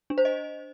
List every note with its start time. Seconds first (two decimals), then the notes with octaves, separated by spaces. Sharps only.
0.10 D4
0.18 C5
0.25 D#5